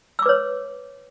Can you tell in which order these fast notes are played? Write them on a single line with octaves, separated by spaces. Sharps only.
E6 D6 B4 C#5